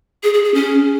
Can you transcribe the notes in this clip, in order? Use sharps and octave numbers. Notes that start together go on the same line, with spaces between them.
G#4
G#4
G#4
C#4